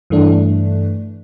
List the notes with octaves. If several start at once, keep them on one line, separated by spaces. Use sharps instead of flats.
G2 E3 A3 D4